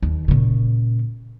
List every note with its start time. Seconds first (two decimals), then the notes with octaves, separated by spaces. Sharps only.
0.02 D#2
0.28 A#2 C#3